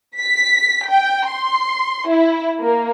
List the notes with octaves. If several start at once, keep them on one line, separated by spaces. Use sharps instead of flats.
B6
G5
C6
E4
A#3